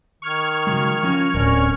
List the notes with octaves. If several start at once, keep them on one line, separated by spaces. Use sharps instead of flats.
D#3 C#6 F6 G#6
C#3 F#3 G#3
F3 C#4 A#4
D1 C#4 A#4 D5